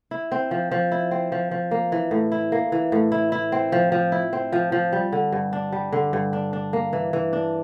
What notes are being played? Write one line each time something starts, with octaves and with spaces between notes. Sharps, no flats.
E4
C4
F3
F3
E4
C4
F3
F3
A#3
E3
A2
E4
A#3
E3
A2
E4
E4
C4
F3
F3
E4
C4
F3
F3
G3
D3
G2
D4
G3
D3
G2
D4
D4
A#3
E3
E3
D4